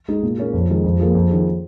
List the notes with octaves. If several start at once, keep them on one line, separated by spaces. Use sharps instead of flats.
G#3 D#4 G#4
A#2
A#3 C#4 G#4
F2
D#3 G#3 D#4 G#4
F2
F3 A#3 F4 G#4
F2
D#3 C#4 G#4